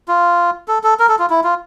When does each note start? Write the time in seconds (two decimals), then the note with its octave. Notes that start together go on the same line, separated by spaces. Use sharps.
0.08 F4
0.68 A4
0.84 A4
0.99 A#4
1.09 A4
1.19 F4
1.30 E4
1.44 F4